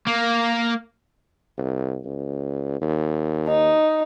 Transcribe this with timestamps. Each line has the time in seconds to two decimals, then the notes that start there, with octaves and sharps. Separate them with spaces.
0.07 A#3
1.57 C2
2.05 C#2
2.81 D#2
3.48 D#4